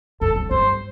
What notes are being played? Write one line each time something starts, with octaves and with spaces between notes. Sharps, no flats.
F#2 A4
F2
G2 C5